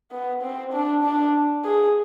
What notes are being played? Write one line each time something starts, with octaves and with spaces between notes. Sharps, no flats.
B3
C4
D4
D4
G#4